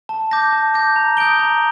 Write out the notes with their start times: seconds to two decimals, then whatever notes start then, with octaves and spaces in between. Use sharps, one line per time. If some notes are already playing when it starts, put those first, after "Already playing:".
0.09 A5
0.31 D6 G6 A#6
0.52 A5
0.74 D6 G6 A#6
0.96 A#5
1.17 D#6 G6 D7 G7
1.39 A#5